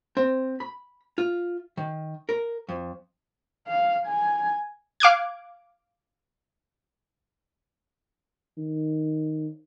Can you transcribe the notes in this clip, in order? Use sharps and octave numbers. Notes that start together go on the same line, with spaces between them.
C4
B5
F4
D#3
A#4
F2
F5
G#5
F5 D6 F#6 G#6
D#3